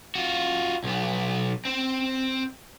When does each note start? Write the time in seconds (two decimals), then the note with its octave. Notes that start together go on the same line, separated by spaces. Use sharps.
0.15 F4 F#4
0.84 B1 B3
1.65 C4 C5